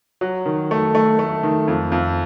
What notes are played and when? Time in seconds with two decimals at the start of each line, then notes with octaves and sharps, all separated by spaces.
0.21 F#3
0.46 D#3
0.71 A3
0.95 A3
1.19 A3
1.43 D#3
1.68 F2
1.92 F2